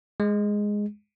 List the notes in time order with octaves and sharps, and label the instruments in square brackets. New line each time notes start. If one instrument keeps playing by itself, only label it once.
[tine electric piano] G#3